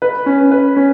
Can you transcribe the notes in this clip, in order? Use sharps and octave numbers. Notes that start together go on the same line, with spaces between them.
B4
C#4
B4
C#4